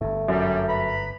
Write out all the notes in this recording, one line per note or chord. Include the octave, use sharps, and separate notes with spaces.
G1 G2 A3
F#2 F#3 G3
B4 A#5 B5